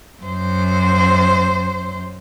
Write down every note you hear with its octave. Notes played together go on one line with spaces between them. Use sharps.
F#2 C5